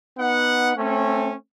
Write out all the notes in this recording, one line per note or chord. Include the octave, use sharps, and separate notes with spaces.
B3 D#4 F#5
A3 C4 C#4